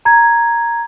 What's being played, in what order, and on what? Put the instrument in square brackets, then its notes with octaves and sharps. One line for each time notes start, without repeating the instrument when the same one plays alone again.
[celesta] A#5 G#6